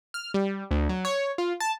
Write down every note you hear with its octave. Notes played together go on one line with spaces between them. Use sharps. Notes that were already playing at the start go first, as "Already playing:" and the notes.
F6
G3
D2
F#3
C#5
F4
A5